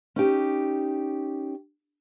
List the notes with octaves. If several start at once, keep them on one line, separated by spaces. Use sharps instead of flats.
C#4 D#4 G4